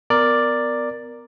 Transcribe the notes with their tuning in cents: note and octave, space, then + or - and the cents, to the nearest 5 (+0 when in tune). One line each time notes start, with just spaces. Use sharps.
B3 +30 A#4 +0 D5 +5